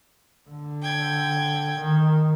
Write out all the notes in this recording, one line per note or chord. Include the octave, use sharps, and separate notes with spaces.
D3
G5 G#6
D#3